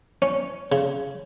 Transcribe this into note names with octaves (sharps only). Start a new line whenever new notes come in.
C#4
C#3